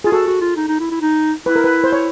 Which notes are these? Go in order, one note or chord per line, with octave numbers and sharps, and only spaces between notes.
F4 G#4
F#4 A4
F#4
F4
D#4
D#4
E4
E4
D#4
E4 B4
A#4
B4
C5
C#5